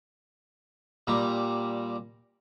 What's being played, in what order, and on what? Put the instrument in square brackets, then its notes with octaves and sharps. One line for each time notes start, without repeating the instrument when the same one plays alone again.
[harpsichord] A#2 G3 A#5